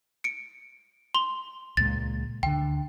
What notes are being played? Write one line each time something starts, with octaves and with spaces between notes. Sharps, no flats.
C#7 D7
C6 G7
C#2 A#2 G#3 A6
D2 D3 G5